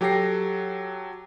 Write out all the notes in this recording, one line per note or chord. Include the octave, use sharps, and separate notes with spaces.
F#3 G4 A4 G5 A#6 C7